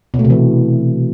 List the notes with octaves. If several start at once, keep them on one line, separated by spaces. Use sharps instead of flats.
B2
A3
C3
E3